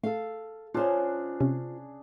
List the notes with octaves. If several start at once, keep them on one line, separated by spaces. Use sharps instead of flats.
A3 A4 F5
C#3 D4 F4 G#4 C5
C3 C#4